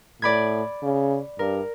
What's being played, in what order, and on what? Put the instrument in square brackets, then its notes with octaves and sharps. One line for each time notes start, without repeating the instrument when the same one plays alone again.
[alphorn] A2 [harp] D5 B5 G#6
[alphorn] C#3
[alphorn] G2 [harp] A#4